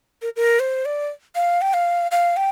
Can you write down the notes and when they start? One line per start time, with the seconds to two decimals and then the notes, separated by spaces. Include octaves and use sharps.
0.22 A#4
0.36 A#4
0.59 C5
0.85 D5
1.35 F5
1.61 G5
1.74 F5
2.11 F5
2.36 G5